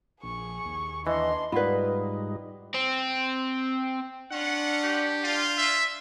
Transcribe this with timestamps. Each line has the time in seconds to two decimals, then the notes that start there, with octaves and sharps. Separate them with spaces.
0.23 A#1 G#4 C#6
0.65 D#2
1.07 E3 D4 D#5 C6
1.52 G#2 G3 D#4 F4 B4 D5 F#5 B5
2.75 C4
4.32 C#4 D4 F4 F#5
4.84 G4
5.23 F4
5.58 E5